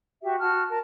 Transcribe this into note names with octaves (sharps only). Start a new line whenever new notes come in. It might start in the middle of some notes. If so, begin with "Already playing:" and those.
F#4 G4 E5
F#4 A5 F6
A#4 A5